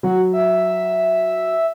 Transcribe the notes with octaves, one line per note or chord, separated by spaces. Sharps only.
F#3 F#4
E5